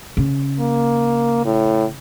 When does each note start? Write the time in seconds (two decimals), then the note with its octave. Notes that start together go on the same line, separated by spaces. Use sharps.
0.17 C#3
0.60 A#3
1.45 A2